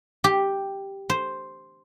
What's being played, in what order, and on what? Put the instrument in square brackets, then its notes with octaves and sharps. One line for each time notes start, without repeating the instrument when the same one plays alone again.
[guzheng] G4
C5